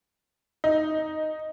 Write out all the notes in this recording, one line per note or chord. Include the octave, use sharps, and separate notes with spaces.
D#4